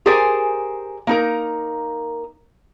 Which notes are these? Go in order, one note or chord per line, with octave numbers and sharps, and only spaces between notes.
G4 G#4 A#4 C5 D5 G#5
A#3 D#4 A#4